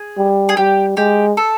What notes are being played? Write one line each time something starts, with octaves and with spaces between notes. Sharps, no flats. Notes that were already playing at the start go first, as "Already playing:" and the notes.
Already playing: G#4
G3
G#4
G3 G4
G#3 G4
A4